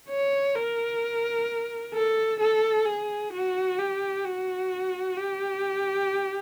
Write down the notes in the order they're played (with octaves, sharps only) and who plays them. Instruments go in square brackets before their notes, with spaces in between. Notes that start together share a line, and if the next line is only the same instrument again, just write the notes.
[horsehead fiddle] C#5
A#4
A4
A4
G#4
F#4
G4
F#4
G4